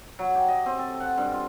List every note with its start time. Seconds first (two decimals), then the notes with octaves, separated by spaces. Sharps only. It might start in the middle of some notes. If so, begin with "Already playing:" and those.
0.19 F#3
0.35 G4
0.48 D#5
0.66 C4
0.79 A4
1.00 F#5
1.18 G2
1.31 F4